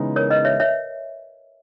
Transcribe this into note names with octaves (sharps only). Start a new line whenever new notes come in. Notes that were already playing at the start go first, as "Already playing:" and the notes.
Already playing: C#3 E3 G#3 B3 D#4
A#4 C#5
B4 D#5
C#5 E5
C#5 E5